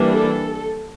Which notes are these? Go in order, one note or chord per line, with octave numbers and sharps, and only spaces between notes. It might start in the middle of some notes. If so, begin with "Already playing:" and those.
Already playing: E3 G3 A#3 D4
A4